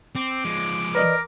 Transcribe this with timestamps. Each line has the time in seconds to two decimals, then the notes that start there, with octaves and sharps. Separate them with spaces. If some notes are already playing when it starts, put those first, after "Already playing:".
0.15 C4 D6
0.45 F3 G#3
0.95 A#4 B4 D5 D#5